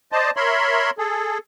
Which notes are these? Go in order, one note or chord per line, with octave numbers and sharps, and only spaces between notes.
C5 D5 D#5 A5
A#4 C#5 E5 B5 C6
G#4 A4